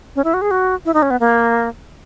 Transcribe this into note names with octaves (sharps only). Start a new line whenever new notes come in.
C#4
E4
F#4
G#4
F#4
E4
D#4
C#4
B3
A#3